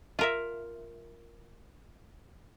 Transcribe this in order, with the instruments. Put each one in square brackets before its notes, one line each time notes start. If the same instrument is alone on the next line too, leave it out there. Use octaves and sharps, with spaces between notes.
[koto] F4 A#4 E5